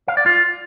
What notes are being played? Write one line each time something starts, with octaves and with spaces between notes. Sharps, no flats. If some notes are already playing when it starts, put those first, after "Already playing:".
F5
D5
F4